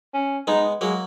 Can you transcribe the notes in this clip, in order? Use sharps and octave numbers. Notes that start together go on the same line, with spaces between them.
C#4
G#3 B3 D#4
F#3 G#3 A#3